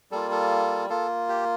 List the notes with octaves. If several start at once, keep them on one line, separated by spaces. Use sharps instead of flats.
G3 A#3 F4 A4
A4
A#3 F4 A4
G4